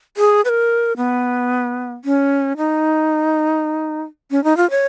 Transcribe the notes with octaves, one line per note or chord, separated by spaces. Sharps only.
G#4
B4
A#4
B3
C#4
D#4
C#4
D#4
F4
C#5